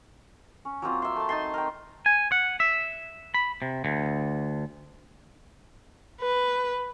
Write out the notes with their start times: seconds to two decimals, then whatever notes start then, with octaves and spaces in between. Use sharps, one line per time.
0.65 C#4
0.82 F#3 A#3 C4 F4
1.02 E5 C6
1.16 A3 A5
1.29 D#4 A5 C6
1.54 A#4 G5
2.06 G#5
2.32 F#5
2.60 E5
3.34 B5
3.62 C3
3.85 D2
6.21 B4